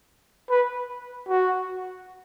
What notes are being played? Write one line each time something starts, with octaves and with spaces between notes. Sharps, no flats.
B4
F#4